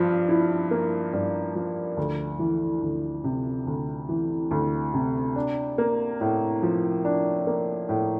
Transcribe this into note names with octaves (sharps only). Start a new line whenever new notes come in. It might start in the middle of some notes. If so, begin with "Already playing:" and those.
Already playing: G2 F3
E4
A#3
G2
F3
D2
E3
D2
C3
D2
E3
D2
C3
D4
A#3
A2
F3
D4
A#3
A2